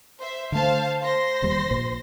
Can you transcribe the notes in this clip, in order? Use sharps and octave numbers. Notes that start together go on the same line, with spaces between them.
C5 E5
D3 A3 C5 F5 A5
C5 C6 A#6
E1 D#2 G3
A#1 A#2